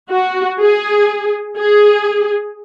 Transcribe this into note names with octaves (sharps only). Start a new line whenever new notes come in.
F#4
G#4
G#4